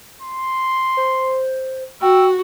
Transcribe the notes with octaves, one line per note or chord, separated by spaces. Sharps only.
C6
C5
F#4 G5 E6